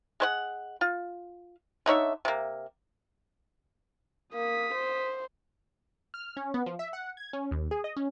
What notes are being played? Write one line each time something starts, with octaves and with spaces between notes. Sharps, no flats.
G#3 C5 F#5
F4
D3 D#4 C#5 E5
C3 A#3
A#3 D#6 B6
C5
F6
C#4
B3
F3
E5
F#5
G#6
C#4
D#2
G#4
D#5
C#4